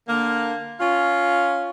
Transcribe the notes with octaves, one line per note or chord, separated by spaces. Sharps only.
D3 A#3
C#4 F4